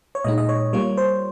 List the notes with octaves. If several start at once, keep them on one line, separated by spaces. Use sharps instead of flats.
C#5
A#2 G#3 D#4 D#5
D#5
C#5
G3 A#3 F4 C#5
C5